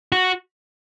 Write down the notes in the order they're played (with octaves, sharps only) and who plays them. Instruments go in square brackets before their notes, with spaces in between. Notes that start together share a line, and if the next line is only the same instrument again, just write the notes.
[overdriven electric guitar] F#4